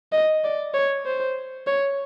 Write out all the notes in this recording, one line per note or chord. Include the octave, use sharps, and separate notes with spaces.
D#5
D5
C#5
C5
C#5